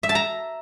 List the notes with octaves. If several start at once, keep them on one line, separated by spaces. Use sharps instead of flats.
E5
A5
A#5